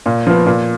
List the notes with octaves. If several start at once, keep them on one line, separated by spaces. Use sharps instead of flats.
A#2
F3 B3
A#2